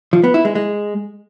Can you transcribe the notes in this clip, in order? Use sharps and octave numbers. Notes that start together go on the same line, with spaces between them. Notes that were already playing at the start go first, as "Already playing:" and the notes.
F3
B3
E4
G#3
G#3